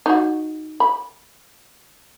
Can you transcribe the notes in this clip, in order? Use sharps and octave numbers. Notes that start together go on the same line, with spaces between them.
D#4 F#4
B5